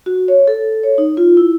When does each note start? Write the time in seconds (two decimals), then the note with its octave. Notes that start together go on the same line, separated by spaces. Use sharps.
0.06 F#4
0.28 C#5
0.47 A4
0.83 C#5
0.98 D#4
1.17 F4
1.37 E4